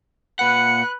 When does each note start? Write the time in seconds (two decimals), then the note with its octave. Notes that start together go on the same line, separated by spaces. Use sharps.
0.39 A#2 B4 F#5 F#6 C#7